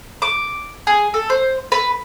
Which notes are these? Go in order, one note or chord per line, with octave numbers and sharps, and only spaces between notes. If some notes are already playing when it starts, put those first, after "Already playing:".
D6
G#4
A4
C5
B4